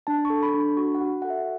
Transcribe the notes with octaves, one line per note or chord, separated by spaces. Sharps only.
D4 A5
C#6
A4
B5
D4
B5
F#4 C#6
F#5
F#4
A4 F#5
E5